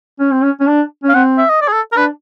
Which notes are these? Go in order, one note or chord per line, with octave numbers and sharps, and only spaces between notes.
C#4
C4
C#4
C#4
D4
C#4
F5
C4 F#5
E5
D#5
D5
G#4
A4
A#4
D4 B4